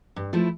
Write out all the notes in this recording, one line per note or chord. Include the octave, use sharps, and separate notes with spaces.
G2
F3 A3 E4